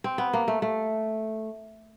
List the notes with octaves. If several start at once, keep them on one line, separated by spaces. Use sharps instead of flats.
C4
B3
A#3
A3
A3